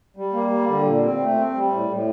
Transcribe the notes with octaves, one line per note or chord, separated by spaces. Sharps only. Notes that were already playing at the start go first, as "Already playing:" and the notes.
G3
A#3
G3
D3
A#2
C4
A3
C4
G3
A2
A2